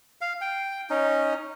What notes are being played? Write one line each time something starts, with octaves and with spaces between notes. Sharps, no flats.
F5
G5
C#4 D#4